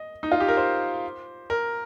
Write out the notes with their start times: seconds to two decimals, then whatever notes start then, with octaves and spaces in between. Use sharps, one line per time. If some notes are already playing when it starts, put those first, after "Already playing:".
Already playing: D#5
0.23 D#4
0.32 F4
0.40 G4
0.48 A#4
0.57 C5
1.50 A#4